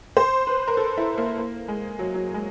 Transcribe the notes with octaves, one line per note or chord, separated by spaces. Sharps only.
C5
B4
A#4
A4
E4
A#3
A#3
G#3
F#3
F#3
G#3